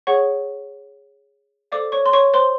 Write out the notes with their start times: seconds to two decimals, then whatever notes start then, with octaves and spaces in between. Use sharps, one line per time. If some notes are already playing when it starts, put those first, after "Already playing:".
0.07 G#4 C#5 F#5 C#6
1.72 A4 C5 D5 F5 D6
1.92 C#5 C#6
2.06 C6
2.13 C#5 C#6
2.34 C5 C6